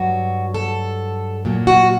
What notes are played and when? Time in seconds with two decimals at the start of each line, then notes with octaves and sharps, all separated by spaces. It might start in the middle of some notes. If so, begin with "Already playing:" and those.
Already playing: G2 F#3 F#4
0.54 A4
1.45 A#2 F#3
1.67 F#4